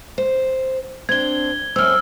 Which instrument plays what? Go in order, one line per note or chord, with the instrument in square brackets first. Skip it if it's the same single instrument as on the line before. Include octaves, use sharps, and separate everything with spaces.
[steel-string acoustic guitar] C5
[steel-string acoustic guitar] C4 D4 [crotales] G#6 G7
[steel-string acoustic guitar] F#2 C4 [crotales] E6 F6